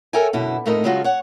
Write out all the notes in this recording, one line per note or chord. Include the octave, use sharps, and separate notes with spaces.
A4 A#4 C#5 E5 G5 G#5
F#2 B2 D3 E4
F2 A2 A3 D#4 A#4 D#5
C#3 F#3 G#3 A3 F4 F#4
C#5 F#5